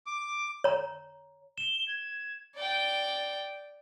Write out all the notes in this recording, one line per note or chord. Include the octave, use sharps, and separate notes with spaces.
D6
C#5 A#5
E7 G7
G#6
D5 G5